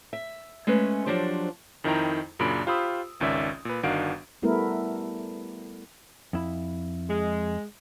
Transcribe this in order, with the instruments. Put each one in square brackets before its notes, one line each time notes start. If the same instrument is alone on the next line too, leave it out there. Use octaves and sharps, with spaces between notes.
[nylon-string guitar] E5
G#3 A3 C#4 B4
F3 F#3 D4 G4 C5
[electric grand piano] F2 D#3 D#4 E4 G5 A#5
F#2 A#2 C#3 D4 B5 D7
F4 G4 C5 B5 D#6 E6
G#1 C#2 D#3 C#4 D5 E5
A#2 B4
G1 D#3 D4 F#4 F5 D7
[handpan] G3 A3 B3 E4 A#4
[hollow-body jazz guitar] F2 E4
[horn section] G#3